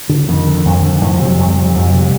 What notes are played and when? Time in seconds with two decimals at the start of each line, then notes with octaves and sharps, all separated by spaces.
0.09 D3
0.28 F2 D#3
0.47 D3
0.65 F2
0.83 D3
1.01 F2 E3
1.14 C3 F3
1.26 F#3
1.38 F2 G3
1.56 C3
1.75 F2 F3
1.88 F#3
1.93 C3
2.00 G3